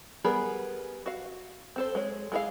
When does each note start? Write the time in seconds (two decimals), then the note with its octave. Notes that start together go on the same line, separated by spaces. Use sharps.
0.24 G3 B3 G#4 A#4 B5
1.06 F#4 F5
1.76 C4 A4 C5
1.95 G#3 G#4 C#5
2.32 G#3 E4 G#4 A#4 F5